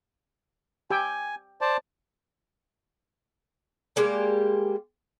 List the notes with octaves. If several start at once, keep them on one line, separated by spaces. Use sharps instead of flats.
G4 G5 G#5 E6
C5 D5 A5
G3 G#3 A#3 G4